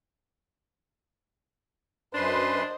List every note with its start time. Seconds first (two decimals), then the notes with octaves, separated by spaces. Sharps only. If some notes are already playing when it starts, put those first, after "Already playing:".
2.14 F#2 D4 B4 C5 D#5 C6